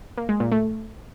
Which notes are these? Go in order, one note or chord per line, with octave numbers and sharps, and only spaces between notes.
A#3
G#3
A#2
A3